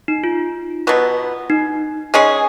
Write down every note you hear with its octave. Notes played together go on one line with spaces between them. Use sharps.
D#4
F4
B2 F#3 B3
D#4
G#3 C#4 G#4